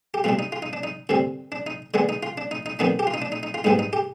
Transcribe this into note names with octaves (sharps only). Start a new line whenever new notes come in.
G4
B2 G3 D4 F4
D#4
F4
D#4
D4
D#4
G2 D3 G3 C4
D4
D#4
D3 G#3 B3 D4
D#4
F4
D4
D#4
D#4
F2 D#3 B3 D4 D#4
G4
F4
D#4
D4
D#4
D#4
F4
G#2 G3 B3 D4 D#4
D#4
G4